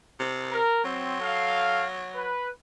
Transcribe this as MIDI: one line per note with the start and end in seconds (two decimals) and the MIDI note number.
0.19 0.59 48
0.51 0.82 70
0.84 2.32 54
0.84 1.16 60
1.21 1.85 69
1.21 1.85 77
2.14 2.49 71